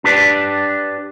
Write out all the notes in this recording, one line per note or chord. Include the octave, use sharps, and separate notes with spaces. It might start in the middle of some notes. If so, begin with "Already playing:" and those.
D4 G4 B4 D5